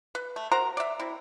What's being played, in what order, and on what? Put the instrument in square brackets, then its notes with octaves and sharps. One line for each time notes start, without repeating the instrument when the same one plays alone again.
[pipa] B4
A3
F#4 A#4 C5 A#5
D5 E5
C4 E4